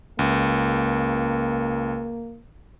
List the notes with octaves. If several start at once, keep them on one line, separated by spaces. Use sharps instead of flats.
C#2 A#3